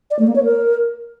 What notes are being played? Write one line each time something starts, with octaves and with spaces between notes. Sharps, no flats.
D5
A3
A#3
C#5
A#4